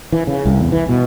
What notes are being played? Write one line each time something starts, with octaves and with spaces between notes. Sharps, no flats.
E3
C#3
C2
E2
E3
B2